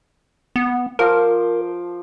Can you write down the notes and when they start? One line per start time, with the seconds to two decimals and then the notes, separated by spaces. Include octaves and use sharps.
0.56 B3
0.99 F3 A#4 C5 D6